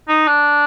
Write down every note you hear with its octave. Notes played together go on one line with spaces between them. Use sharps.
D#4
D4